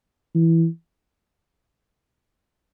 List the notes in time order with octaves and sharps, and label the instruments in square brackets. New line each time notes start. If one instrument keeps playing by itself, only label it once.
[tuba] E3